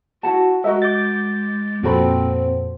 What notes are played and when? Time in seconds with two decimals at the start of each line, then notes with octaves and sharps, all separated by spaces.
0.23 E4 F#4 F#5 A5
0.64 G#3 F#4 A#4 D#5 E5
0.82 D6 G6 A6
1.83 F2 A#2 C4 F#4 A4 C5 B5